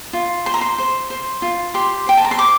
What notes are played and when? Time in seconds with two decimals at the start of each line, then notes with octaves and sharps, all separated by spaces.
0.13 F4
0.46 C5 C6
0.54 A#5
0.61 C6
0.78 C5
1.10 C5
1.42 F4
1.74 G4 C6
2.06 C5 G5
2.17 A5
2.25 A#5
2.31 C6
2.38 C5 D6